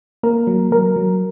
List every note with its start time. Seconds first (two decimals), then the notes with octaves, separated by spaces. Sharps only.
0.23 A#3 A#4
0.47 F#3
0.72 F#3 A#4
0.96 F#3